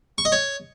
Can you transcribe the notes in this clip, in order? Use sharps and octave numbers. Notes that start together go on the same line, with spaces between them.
C#6
D#5
C#5